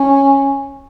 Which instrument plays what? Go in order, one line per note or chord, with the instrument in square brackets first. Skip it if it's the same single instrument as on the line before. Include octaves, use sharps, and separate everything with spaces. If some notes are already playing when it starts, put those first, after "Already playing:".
Already playing: [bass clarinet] C#4